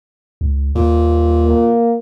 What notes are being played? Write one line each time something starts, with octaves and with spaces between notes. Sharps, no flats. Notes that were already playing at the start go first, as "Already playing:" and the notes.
C#2
D#2 A#2
A#3